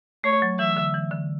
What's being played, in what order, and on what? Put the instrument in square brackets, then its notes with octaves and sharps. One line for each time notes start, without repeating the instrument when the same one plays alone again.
[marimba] A3 [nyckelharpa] C#5
[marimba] F#3
[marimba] E3 [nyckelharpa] E5
[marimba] D3
E3
D3